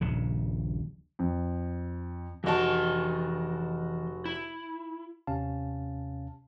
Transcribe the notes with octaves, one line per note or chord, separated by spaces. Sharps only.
D#1 A#1 C#3
F2
F1 E3 F#4 D#5 A5
E4
D#2 C3 C#4 F5 A5